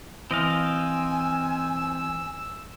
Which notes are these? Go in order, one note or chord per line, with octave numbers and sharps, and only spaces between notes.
E3 C4 D#5 F5 G#5 E6